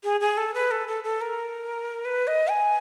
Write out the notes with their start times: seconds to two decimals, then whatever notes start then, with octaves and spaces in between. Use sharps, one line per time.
0.04 G#4
0.20 G#4
0.37 A4
0.54 B4
0.71 A4
0.88 A4
1.04 A4
1.21 A#4
2.05 B4
2.27 D#5
2.50 G#5